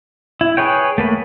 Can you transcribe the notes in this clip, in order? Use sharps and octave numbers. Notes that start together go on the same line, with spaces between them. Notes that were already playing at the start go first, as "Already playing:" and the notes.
E4
G#4 B4 C#5 G5
A3 A#3 B4